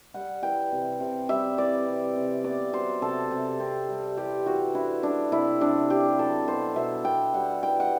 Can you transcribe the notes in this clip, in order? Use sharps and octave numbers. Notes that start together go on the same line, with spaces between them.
G3 F#5
E3 G5
C3
C3
G3 E5
E3 D5
C3
C3
B3 D5
F#3 C5
C3 A4
C3
C4
G3
E3 G4
E3 F#4
D4 E4
G3 D4
C3 E4
C3 D4
C4 G4
F#3 A4
B2 C5
B2 E5
B3 G5
G3 F#5
E3 G5
F#5